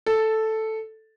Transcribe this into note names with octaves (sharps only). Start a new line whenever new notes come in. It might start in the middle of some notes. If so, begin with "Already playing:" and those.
A4